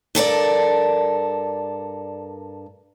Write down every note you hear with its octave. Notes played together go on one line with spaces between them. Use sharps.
G2 A4 A#4 D5